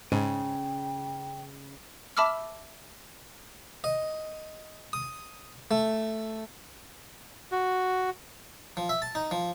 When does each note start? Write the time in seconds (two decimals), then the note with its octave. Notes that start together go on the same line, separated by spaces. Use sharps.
0.12 G#2 C#3 G5
2.17 E5 A5 B5 D6 E6 F6
3.84 D#5
4.93 D#6
5.71 A3
7.52 F#4
8.77 F3
8.89 E5
9.02 A5
9.15 D#4
9.31 F3